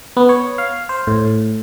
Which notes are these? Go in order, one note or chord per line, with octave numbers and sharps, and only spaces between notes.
B3
C#5
F5
C5
A2